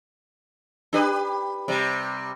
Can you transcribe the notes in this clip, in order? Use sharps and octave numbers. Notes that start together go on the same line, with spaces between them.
D4 G4 B4
C3 G3